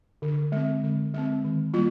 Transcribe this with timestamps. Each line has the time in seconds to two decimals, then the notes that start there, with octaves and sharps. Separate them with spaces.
0.22 D3
0.52 G#3 C4
0.83 D3
1.14 G#3 C4
1.44 D#3
1.74 G3 A#3 F4